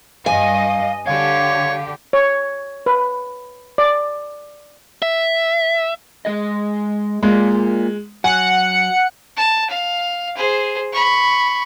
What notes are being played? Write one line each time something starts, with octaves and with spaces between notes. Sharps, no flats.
G2 D#5 F5 G#5
D3 G4 C#5 F5
C#5
B4
D5
E5
G#3 G#4 D#5
G#3 A#3 F4
F#3 F#5 G#5 C#7
A5
F5
G#4 C5
B5 C#6